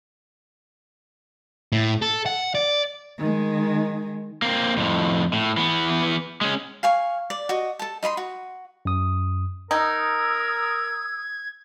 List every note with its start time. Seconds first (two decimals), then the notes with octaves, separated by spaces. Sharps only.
1.72 A2
2.02 A4
2.26 F#5
2.55 D5
3.18 D#3 G#3
4.42 A#3 C4
4.78 F2 A2
5.33 A2
5.57 E3 B3
6.41 G#3 C#4
6.83 F5 G#5 C#6
7.30 D5
7.49 F#4 D#5
7.79 A4 A5
8.03 D#4 D#5 B5 C6
8.17 F#4
8.85 F#2 D#6
9.71 D#4 A#4 D#6 E6 G#6